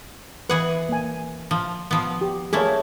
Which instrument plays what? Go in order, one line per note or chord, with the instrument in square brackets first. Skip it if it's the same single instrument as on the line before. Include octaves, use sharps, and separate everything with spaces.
[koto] E3 G#4 F#5 [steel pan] B4
[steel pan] A#3 G#5
[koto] F3
F3 B3
[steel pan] G4
[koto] A3 A#3 E4 [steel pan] G#4 C#5